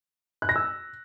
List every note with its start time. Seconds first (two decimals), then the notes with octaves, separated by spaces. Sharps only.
0.42 F#6
0.49 A#6
0.56 E6